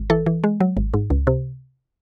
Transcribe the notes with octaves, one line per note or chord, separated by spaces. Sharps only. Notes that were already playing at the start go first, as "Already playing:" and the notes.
Already playing: G#1
E3 A4
E3
G#3
F#3
G#1
G#2
C#2
C3